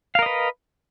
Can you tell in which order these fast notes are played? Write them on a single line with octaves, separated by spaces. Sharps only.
F5 A#4 D#5 B4